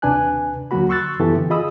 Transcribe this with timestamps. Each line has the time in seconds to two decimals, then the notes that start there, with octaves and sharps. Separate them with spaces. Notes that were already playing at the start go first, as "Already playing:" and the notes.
0.02 D#2 C3 D4 B4 G#5 F#6
0.71 D#2 D3 F#3 A#3 F#4 B5
0.89 C6 C#6 E6 F#6 A6
1.19 F#2 E3 B3 G4 A4 E5
1.36 D3
1.50 F4 G#4 D#5 B5 D#6 E6